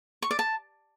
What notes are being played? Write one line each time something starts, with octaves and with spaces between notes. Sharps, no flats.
C#6
D5
A5